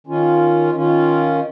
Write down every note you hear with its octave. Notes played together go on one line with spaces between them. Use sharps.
D#3 C#4 F4
D#3 C#4 F4